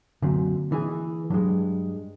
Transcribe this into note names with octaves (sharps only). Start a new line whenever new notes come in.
F#2 D3 A#3 C4
E3 G#4
G2 F#3 G#3